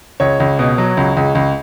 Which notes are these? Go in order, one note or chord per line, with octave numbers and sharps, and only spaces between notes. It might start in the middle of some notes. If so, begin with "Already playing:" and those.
C#2 C#5
C#2
B2
F#3
C#2
C#2
C#2